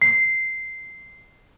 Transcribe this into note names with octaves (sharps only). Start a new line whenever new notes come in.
C7